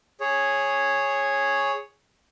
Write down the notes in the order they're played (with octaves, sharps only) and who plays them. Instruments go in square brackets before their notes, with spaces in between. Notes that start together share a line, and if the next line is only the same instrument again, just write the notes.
[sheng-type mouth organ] G#4 C#5